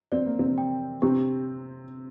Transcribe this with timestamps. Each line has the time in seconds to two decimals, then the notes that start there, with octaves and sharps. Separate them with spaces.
0.12 C4 D5
0.26 A#3
0.39 C3 C4
0.58 G5
1.02 C3 C4 G4